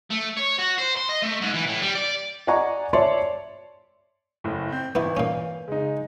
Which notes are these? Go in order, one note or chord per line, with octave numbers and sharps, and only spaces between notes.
A3
C#5
F#4
C5
C6
D#5
A3
G#2
E3
A2
G3
D5
D5 D#5 F#5 G#5 A#5 C#6
C#5 D5 E5 A5 C6
F#1 A2
C4 G6
G#1 E3 B3 E4
A#2 C#4 F5
C#3 G#3 D#4